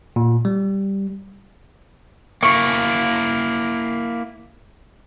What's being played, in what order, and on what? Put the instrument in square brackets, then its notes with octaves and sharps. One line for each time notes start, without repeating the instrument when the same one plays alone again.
[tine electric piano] A#2
G3
[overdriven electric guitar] A#3 E4 [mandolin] C#6